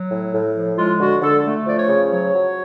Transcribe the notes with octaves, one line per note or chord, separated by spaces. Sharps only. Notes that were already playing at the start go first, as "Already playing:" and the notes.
Already playing: F#3
A2
A2
F3
G#3 F4
D3 F#4
D3 A4
A3
F3 D5
C#5
C#3
F#3 C#5
F#3